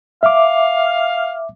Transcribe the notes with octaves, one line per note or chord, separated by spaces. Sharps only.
E5 F5 D6